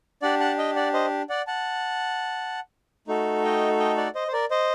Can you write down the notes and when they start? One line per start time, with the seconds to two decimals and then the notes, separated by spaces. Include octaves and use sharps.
0.22 D4 G4 D5 F#5
0.40 F#5 A5
0.58 D#5 G5
0.76 D5 F#5
0.94 C5 D#5
1.29 D5 F#5
1.47 F#5 A5
3.08 A3 D#4 F#4 A4
3.44 D#5 G5
3.80 D#5 G5
3.97 D5 F#5
4.15 C5 D#5
4.28 C5
4.33 A#4 D5
4.51 C5 D#5